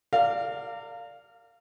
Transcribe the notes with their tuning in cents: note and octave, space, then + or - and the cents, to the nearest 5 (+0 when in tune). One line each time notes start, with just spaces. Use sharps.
A#4 -30 D5 +0 F5 +0